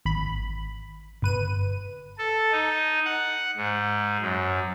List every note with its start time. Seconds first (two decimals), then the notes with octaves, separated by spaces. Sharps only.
0.06 G#1 B5
1.22 G1 B4 D#7
2.18 A4
2.52 D#4
3.05 F#5
3.57 G#2
4.22 F#2